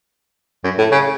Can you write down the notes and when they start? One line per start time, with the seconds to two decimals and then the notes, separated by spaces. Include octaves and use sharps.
0.64 F#2
0.78 A2
0.92 C#3